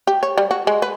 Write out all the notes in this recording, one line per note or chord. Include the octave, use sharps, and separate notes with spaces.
G4
C#5
G3
F#4
G#3
B4